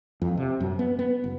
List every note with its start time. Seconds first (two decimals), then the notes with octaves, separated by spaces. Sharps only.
0.22 F2
0.37 C3
0.60 F#2
0.79 B3
0.99 B3
1.24 F#1